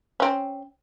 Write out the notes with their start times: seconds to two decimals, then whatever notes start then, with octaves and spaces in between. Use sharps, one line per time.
0.20 C4 C#4